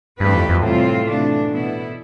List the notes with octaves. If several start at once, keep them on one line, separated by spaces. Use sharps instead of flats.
G2 E3 A3 C4 G4 B4
F2
F2
A2 C3 E3 G3 C4 F4
C3 E3 A3 D4
B2 B3 E4